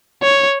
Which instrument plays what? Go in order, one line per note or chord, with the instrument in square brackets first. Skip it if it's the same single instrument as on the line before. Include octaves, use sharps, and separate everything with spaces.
[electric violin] C#5